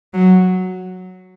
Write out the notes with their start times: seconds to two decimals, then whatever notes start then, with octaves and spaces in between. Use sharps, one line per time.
0.14 F#3